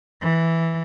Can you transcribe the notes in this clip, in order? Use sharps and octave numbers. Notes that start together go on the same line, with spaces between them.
E3